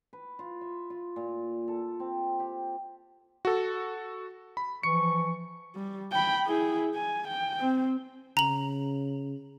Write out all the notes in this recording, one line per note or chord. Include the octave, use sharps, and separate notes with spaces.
B4
F4
E5
F4
A#2
A4
C4
G4
F#4 A4
B5
E3 F3 C#6 C#7
G3
G5 B5
E4 G#4
G#5
G5
C4
C#3 A#5 F#7